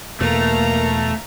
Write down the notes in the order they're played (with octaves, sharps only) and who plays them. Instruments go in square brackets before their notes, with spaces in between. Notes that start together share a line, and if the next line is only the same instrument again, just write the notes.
[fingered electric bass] E2 B2 [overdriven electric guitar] A3 [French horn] A#3 [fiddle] F5 A#5